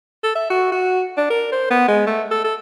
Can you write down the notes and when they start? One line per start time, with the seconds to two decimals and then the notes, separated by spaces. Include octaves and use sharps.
0.24 A4
0.35 E5
0.50 F#4
0.72 F#4
1.17 D4
1.30 A#4
1.52 C5
1.71 B3
1.88 G#3
2.07 A3
2.31 A4
2.44 A4